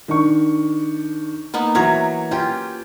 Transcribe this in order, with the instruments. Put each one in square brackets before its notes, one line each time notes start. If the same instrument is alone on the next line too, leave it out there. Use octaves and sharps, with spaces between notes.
[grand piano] D#3 D4 C#6
[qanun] A#3 B3 D#4
[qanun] E3 F#3 C#5 [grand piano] E5 A#5 G#6
[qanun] C#4 F4 G4 [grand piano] G5